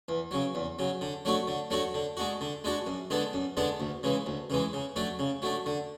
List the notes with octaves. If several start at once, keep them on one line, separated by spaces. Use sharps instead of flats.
E2
C#3 F#3
E2
C#3 F#3
D3
F#3 A3 D4 F#4
D3
F#3 A3 D4 F#4
D3
G#3 D4 F#4
D3
G#3 D4 F#4
F#2
D3 G#3 B3 D4
F#2
D3 G#3 B3 D4
D2
C#3 E3 G#3
D2
C#3 E3 G#3
C#3
F#3 A3 D4
C#3
F#3 A3 D4
D3